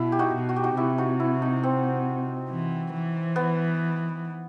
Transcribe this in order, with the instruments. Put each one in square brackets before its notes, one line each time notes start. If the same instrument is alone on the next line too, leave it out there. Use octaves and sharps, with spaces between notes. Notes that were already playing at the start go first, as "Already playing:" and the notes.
Already playing: [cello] B2 [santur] E4
[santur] G4
D#4 F#4
[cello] B2
[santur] F#4
G4
D#4 F#4
[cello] C3 [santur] E4 G4
[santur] D#4 F#4
E4
D#4
C4
[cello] E3
E3
[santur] B3